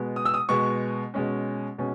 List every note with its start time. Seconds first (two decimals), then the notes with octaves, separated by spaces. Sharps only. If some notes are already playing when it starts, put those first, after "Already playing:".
Already playing: B2 G#3 B3
0.16 D#6
0.25 E6
0.34 D#6
0.49 B2 G#3 B3 C#6
1.14 B2 G#3 C#4
1.78 B2 G#3 C#4